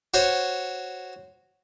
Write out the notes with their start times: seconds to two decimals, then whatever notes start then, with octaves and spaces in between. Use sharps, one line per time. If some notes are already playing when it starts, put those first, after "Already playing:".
0.14 F#4 C5 C#5